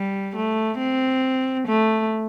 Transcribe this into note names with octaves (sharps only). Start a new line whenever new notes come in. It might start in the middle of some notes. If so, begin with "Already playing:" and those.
Already playing: G3
A3
C4
A3